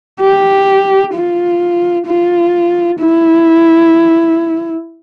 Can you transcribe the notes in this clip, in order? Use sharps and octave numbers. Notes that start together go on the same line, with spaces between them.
G4
F4
F4
E4